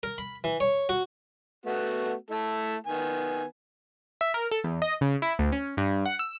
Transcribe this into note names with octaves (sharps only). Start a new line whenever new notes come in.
A#4
B5
E3
C#5
F#4
A3 B3 F#4
A3 E4 A4
D#3 B3 G#5
E5
A#4
A4
E2
D#5
C#3
E4
D2
C#4
G2
F#5
E6